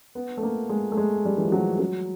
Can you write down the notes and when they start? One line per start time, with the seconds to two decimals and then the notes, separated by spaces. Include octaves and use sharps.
0.15 B3
0.37 A3
0.43 A#3
0.69 G#3
0.92 A3
0.97 G#3
1.25 G3
1.37 E3
1.45 F3
1.52 F#3
1.79 F#3